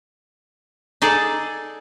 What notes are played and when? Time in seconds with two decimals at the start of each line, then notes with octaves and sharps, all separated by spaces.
1.02 D#4 G#4 A4 D5